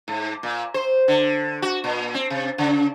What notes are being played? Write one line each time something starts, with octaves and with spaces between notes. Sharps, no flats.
G#2
A#2
C5
D3
F#4
A#2
C4
C3
C#3